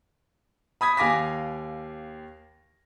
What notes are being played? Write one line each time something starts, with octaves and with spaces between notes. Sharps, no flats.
B5 D#6 G#6 B6
D#2 F5 G#5 D6 A#6 B6